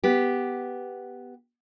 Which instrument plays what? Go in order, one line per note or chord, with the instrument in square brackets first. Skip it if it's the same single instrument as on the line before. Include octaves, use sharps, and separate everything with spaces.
[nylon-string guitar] B3 G4